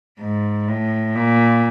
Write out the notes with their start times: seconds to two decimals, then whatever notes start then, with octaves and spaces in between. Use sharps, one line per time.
0.20 G#2
0.68 A2
1.15 A#2